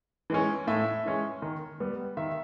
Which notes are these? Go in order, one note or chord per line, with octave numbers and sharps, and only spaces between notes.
E3 G#3 C#4
A2 E5
E3 G#3 C#4
D#3
G3 B3
D#3 E5